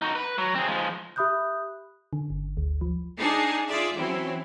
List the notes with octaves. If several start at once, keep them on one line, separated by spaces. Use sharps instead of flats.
D#4 F#4
B4
F#3
C4 G#4
F3 G#3
G4 E5 B5 D#6 F#6 G6
D3
G1
D2
F3
D4 D#4 G#4 A5 C7 C#7
F4 G#4 D5 E5
E3 F#3 C4 C#4 E4